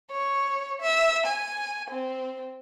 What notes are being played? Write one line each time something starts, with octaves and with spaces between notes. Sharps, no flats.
C#5
E5
G#5
C4